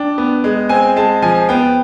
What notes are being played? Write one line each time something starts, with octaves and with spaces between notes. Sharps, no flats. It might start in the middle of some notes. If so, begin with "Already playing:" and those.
Already playing: D4 G5
B3
G#3
C4 G#5
G#3 A5
F3 G#5
B3 G5